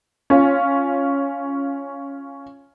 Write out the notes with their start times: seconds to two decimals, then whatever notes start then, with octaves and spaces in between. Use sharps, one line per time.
0.30 C#4 F4